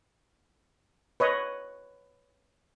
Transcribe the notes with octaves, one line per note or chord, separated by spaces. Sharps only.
B4 C#5 D#5